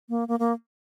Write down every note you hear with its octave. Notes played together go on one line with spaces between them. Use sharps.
A#3
A#3
A#3